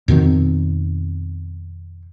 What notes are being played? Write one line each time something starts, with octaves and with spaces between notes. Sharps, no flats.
F2 B2 D#3 C4